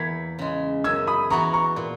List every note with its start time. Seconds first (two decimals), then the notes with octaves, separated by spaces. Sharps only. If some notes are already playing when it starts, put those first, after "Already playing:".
Already playing: E2 A#3 E4 G#6 B6
0.39 C#3 G#3
0.84 F#2 E6 G#6
1.07 B5 D#6
1.30 E3 B3 F#4 A#5 C#6
1.53 A#5 C#6
1.76 A#2